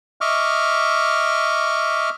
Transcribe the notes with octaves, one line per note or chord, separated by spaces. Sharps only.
D#5 E5 C#6 D6 F6